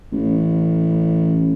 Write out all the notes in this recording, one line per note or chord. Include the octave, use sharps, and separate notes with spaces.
A1